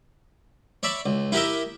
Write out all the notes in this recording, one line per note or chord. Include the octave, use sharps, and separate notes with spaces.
C#5 D5 E5 B5
C#2
E4 G4 A#4 D#5 E5